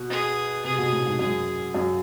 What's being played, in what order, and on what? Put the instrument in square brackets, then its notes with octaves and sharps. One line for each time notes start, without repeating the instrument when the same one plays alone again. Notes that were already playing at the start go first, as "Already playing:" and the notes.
Already playing: [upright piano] B2
[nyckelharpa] G#4
[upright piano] C3 [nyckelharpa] G#4
[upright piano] B2
A2
G#2
[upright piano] F#2 [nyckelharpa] G#4
[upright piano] F#2